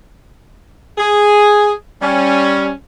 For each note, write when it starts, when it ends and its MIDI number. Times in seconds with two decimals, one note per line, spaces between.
0.97 1.72 68
2.01 2.69 55
2.01 2.69 61